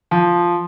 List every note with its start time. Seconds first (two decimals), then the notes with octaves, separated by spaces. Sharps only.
0.11 F3